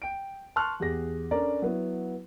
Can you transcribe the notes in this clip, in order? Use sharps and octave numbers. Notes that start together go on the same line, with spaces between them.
G5 D7
A5 C6 C#6 F6 F#6
E2 G4 G#4 A#6
C#4 D4 A4 A#4 D5 A#5
F#3 B3 E4